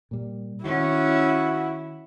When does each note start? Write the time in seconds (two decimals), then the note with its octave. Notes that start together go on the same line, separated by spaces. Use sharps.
0.11 A#2 G3
0.65 D#3 C#4 E4 F#4